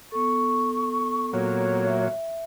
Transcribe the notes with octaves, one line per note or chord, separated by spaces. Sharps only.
B3 A4 C#6
A#2 F#3 C#5
E5